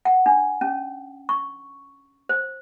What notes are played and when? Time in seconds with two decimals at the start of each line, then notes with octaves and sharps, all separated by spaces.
0.05 F#5
0.26 D4
0.61 C#4
1.29 C#6
2.29 C5